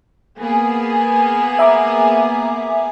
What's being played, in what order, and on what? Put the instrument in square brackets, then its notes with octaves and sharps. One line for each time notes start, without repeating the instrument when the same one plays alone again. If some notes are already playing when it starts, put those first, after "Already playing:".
[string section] A#3 B3 G#4
[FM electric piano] E5 A#5 D6